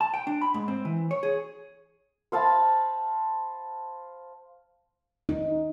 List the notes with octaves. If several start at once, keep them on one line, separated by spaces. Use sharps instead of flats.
A5
G5
D4
B5
G#2
C4
E3
C#5
G#4
C5 F5 A5 B5
D#4